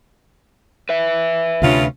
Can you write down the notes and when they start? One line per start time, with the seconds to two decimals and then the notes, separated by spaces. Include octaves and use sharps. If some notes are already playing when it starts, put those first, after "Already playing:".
0.89 B4 E5
1.62 D2 G2 C3 C#4 D4 F4